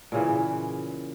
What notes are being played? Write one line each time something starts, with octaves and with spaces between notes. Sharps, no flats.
A#2 C#3 E3